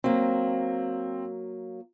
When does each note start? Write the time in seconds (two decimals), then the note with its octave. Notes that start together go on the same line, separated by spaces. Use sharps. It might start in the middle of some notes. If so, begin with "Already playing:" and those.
0.04 F#3 A#3 C4